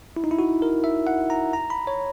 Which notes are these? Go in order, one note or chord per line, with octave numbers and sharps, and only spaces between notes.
E4
D#4
E4
F#4
A#4
E5
F#5
A#5
A#5
B5
C#5